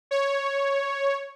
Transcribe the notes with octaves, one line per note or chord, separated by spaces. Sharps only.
C#5